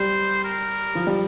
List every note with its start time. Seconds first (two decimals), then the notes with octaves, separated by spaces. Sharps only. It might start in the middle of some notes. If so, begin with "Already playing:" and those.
Already playing: G3 C5
0.44 A#4
0.95 F3
1.07 G3